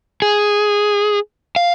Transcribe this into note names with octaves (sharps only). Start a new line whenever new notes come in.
G#4
F5